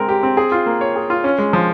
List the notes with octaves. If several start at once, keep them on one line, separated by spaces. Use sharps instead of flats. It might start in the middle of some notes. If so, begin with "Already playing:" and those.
Already playing: G#3 C4 A#4
G4
C4
G#4
F4
A#3
C#5
G#4
F4
C#4
G#3
F3